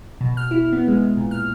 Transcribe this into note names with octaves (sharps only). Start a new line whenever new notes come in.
B2
F6
E4
B3
G#3
A#2
F6